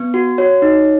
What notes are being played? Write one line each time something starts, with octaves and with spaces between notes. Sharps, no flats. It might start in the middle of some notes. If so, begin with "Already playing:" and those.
Already playing: B3
F#4
F#4 C#5
D#4